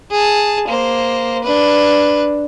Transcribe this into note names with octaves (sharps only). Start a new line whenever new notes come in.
G#4 A5
A#3 C5
D4 B4